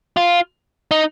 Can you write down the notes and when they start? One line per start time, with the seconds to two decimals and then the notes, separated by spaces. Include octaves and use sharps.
0.17 F4
0.91 D#4